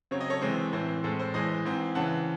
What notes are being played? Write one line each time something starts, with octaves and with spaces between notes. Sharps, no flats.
C#3 F#3 C4 C#5
D#5
A4 C#5
C3 E3 G#3 C4
A2 E3 C4 C5
A2 G#3 C4 A4
C5
A2 E3 G#3 C5 D#5
G#2 E3 C4
C#3 E3 C4 F#5 A5